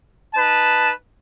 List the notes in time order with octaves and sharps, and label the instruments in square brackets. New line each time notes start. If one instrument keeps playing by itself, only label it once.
[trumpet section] D#4 B4 A5